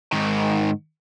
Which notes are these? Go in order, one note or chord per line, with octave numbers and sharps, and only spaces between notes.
G#2 D#3